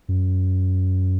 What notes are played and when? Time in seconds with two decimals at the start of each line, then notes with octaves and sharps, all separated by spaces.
0.09 F#2